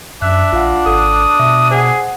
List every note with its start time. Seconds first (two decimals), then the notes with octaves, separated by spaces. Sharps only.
0.22 F#2 D4 E5 F#6
0.53 A#1 F4 F5 F#5
0.86 G#1 A4 D#6
1.39 B2 E5
1.71 G#4 C5 F#5